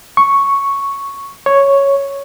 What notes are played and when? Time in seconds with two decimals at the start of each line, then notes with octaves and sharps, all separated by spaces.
0.17 C#6
1.46 C#5